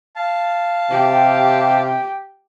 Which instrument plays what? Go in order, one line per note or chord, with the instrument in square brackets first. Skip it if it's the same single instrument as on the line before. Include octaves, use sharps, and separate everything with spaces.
[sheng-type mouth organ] F5 A5
[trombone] C3 [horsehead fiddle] G4